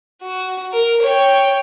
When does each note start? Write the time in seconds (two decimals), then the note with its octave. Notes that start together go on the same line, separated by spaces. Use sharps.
0.22 F#4
0.72 A#4
1.02 C#5 G5